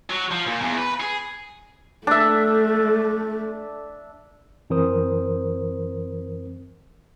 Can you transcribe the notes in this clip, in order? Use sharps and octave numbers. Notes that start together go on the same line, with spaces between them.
F#3
F3
A#2
E2
B4
G#4
A3 D4 E5
F#2 E3 C4 A#4 C5 D#6